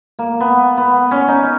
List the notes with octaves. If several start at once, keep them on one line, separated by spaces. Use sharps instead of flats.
A#3
B3
B3
C#4
D#4